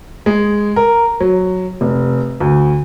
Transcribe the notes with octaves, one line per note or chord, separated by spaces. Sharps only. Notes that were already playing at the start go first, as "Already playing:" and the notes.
G#3
A#4
F#3
F1
D2